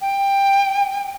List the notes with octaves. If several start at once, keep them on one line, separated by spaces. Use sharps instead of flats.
G5